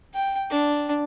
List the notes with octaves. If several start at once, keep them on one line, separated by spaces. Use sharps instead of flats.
G5
D4